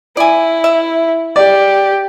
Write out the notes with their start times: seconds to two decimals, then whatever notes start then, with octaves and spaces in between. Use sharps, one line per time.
0.17 E4 D5 G#5
0.64 E5
1.36 G4 D5